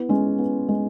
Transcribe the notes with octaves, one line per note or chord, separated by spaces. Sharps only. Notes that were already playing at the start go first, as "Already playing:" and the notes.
Already playing: B3 E4
G#3 C#4
B3
G#3